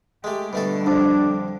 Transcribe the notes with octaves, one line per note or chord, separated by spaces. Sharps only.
G#3 A3 G4
B2 D3 G3 A3 A4
C2 F2 D4